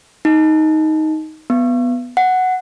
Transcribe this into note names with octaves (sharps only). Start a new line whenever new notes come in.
D#4
B3
F#5